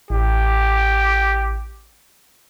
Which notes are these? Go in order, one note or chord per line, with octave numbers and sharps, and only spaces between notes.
A1 G4